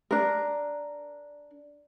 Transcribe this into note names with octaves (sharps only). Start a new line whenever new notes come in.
D4 A#4